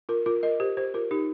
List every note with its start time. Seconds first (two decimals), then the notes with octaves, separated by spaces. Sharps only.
0.09 F4 A#4
0.26 F4 A#4
0.43 A#4 D#5
0.60 G4 C5
0.77 G4 C5
0.94 F4 A#4
1.11 D#4 G4